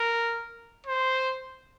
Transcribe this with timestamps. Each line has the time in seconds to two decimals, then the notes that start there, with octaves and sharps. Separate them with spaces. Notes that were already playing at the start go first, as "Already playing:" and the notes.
Already playing: A#4
0.87 C5